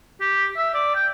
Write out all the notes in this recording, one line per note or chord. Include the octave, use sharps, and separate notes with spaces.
G4
E5
D5
G5